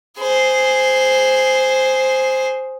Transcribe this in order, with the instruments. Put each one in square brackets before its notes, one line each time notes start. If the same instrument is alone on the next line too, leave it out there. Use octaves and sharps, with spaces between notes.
[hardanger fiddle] G#4 C5